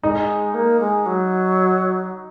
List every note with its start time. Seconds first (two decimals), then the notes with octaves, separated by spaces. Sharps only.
0.03 G#3 D#4
0.54 A#3
0.80 G#3
1.06 F#3